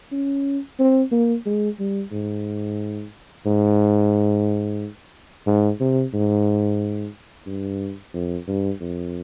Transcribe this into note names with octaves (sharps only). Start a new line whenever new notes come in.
C#4
C4
A#3
G#3
G3
G#2
G#2
G#2
C3
G#2
G2
F2
G2
F2